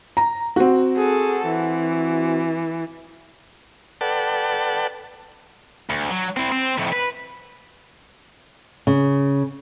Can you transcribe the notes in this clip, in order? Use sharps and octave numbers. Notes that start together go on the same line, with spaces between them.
A#5
C4 F#4
G#4 A4
E3
A4 B4 D5 F#5 G5 A5
D2
F#3
C4 E4
C4
F2 A2
B4
C#3